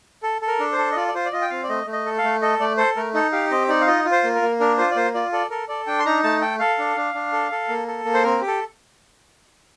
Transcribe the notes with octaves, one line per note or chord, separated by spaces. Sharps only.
A4
A4
A#4
D4
C5
A4
D#5
F4 D5
D5
F4 C5
D5
F4 D#5
G5
C4 F5
D5
A3 D#5
A3
D#5
A4
F5
A3
A4 D#5
A3 D5
A4 C5
A3 A#4
D#4 A4
G4 F5
C4 D#5
D#4 D5
F5
F4 D#5
F4
C5
A#3
A#4
A#3
D4 A#4
F4 C5
D5
A#3 C5
F4 D5
A4 D5
A4 A#4
A4 D5
D4 G5
C6
D#4 A#5
A3 A5
A4 G5
A4 F5
D4
D4
D4
A4
A4
A#3
A4
A#3
C5
C4 A#4
G4
A4